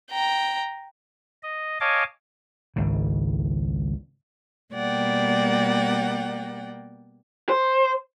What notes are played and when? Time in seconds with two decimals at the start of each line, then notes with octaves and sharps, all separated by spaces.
0.11 G5 A#5
1.43 D#5
1.80 C#5 D#5 F5 G#5 A5 D6
2.76 G#1 C#2 C#3
4.73 B2 G3 A#3 D5 F#5 G5
7.49 C5